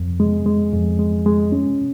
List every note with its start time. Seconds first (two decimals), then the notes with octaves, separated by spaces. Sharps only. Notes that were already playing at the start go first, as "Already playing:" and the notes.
Already playing: F2
0.20 G#3
0.46 G#3
0.73 F2
0.99 G#3
1.26 G#3
1.52 C#4